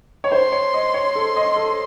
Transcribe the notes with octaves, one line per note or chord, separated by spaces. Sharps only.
C#5
C5 C6
C#5
D#5
C#5
A4
D#5
A4